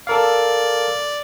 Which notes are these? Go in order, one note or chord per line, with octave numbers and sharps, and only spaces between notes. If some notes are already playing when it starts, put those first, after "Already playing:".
A4 A#4 D5 F5